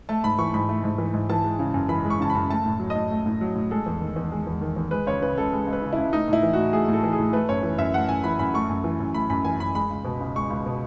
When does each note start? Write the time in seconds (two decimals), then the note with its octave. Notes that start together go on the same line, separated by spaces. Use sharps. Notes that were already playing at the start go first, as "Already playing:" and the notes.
0.09 A3 A5
0.24 G#2 B5
0.38 E3 C#6
0.54 G#2 B5
0.69 A3
0.84 G#2
0.98 E3
1.14 G#2
1.30 E3 A5
1.44 G#3
1.59 C#3
1.74 F#2
1.89 E3 B5
2.04 G#3
2.10 C#6
2.20 C#3 A5
2.30 F#2 B5
2.50 A3 A5
2.65 A2
2.80 F#3
2.90 D#5
2.95 A2
3.11 A3
3.26 A2
3.41 F#3
3.55 A2
3.71 G#3 A4
3.86 E2
4.01 D#3
4.16 E2
4.32 G#3
4.47 E2
4.61 D#3
4.76 E2
4.91 G#3 B4
5.07 C#2 C#5
5.22 C#3 B4
5.37 C#2 A4
5.53 G#3
5.67 C#2
5.73 B4
5.82 C#3
5.93 E4
5.98 C#2
6.12 A3 D#4
6.28 A2 E4
6.43 E3
6.53 A2 F#4
6.73 A3 G#4
6.88 A2
6.93 A4
7.03 E3
7.13 G#4
7.19 A2
7.33 A3 B4
7.49 F#2 C#5
7.63 E3
7.78 F#2 E5
7.94 A3 F#5
8.09 F#2 G#5
8.24 E3 B5
8.39 F#2 B5
8.54 A3 C#6
8.69 F#2
8.84 E3
9.00 F#2
9.14 A3 B5
9.30 F#2 B5
9.45 E3 G#5
9.60 F#2 B5
9.75 G#3 B5
9.90 C#2
10.05 B2
10.20 C#2
10.36 G#3 C#6
10.50 C#2
10.66 B2